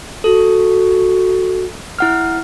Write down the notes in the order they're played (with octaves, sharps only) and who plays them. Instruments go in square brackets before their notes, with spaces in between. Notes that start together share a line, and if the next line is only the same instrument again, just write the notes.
[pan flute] F#4 [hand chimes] A4
[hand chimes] E4 F#5 F6